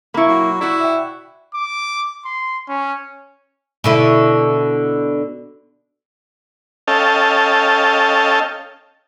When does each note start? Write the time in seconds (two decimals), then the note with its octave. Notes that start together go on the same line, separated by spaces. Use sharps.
0.14 A#3 E4 B5 C#6
0.27 F#3
0.61 E4 F#4 D5
0.81 E5 G5
1.54 D6
2.25 C6
2.69 C#4
3.84 B2 D3 E4
6.88 C#4 A4 D#5 F5 G5 A5